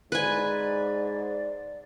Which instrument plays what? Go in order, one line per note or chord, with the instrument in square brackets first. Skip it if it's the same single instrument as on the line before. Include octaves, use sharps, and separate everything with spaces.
[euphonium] G#2 [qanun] B4 G#5 [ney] D5